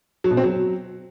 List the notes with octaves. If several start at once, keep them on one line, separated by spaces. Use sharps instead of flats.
F#3
B2
C4
F#3